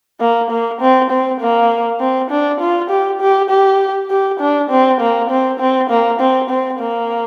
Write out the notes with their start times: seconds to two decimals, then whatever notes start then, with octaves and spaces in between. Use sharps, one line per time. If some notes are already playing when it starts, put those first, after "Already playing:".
0.20 A#3
0.50 A#3
0.81 C4
1.10 C4
1.40 A#3
2.00 C4
2.30 D4
2.60 F4
2.90 G4
3.21 G4
3.50 G4
4.10 G4
4.40 D4
4.70 C4
5.01 A#3
5.30 C4
5.60 C4
5.90 A#3
6.21 C4
6.50 C4
6.79 A#3